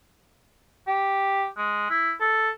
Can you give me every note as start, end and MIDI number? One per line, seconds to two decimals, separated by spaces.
0.87 1.47 67
1.57 1.90 56
1.90 2.12 64
2.20 2.50 69